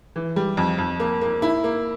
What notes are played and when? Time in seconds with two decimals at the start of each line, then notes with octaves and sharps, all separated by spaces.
0.16 E3
0.36 G3
0.57 F2
0.78 F2
1.00 A#3
1.21 A#3
1.42 E4
1.64 A#3